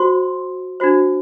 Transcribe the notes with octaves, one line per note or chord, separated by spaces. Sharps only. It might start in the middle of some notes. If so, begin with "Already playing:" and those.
Already playing: F#4 C5 C6
D4 F#4 C5